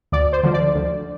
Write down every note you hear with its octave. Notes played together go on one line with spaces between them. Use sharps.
D2 D5
C5
D3 F3
D5
D2